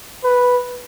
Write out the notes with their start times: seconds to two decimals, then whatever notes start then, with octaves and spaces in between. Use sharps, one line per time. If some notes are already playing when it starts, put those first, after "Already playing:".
0.24 B4